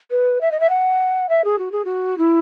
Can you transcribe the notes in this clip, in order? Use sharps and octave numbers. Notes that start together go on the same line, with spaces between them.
B4
E5
D#5
E5
F#5
E5
G#4
F#4
G#4
F#4
E4